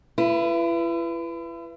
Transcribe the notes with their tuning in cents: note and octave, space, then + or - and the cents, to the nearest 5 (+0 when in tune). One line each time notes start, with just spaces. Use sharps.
E4 +40 B4 +0